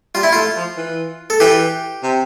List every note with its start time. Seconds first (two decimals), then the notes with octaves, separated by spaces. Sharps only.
0.15 G3 F4
0.23 E4
0.33 A3 F4
0.57 F3
0.77 E3
1.30 A4
1.40 E3 G4
2.03 C3